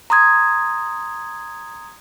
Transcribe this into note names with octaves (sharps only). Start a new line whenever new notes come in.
A#5 C6 D#6 G#6